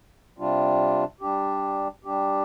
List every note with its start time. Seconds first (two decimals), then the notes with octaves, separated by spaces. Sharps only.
0.38 C3 G3 D4 F4
1.21 G3 D4 G4
2.05 G3 D4 G4